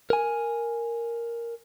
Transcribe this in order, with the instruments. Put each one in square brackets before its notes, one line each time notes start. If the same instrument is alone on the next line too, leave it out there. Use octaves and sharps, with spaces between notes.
[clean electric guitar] A#4 G#5